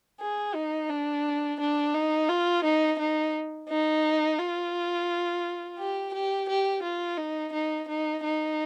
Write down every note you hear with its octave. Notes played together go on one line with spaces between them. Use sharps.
G#4
D#4
D4
D4
D#4
F4
D#4
D#4
D#4
F4
G4
G4
G4
F4
D#4
D#4
D#4
D#4